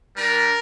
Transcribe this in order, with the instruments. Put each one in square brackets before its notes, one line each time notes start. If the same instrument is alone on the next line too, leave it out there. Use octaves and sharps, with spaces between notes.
[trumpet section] G3 D4 G4 A#4